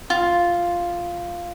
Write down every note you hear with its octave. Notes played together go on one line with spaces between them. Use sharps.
F4